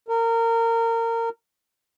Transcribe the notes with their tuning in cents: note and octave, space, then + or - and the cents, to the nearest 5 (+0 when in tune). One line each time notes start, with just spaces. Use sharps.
A#4 -25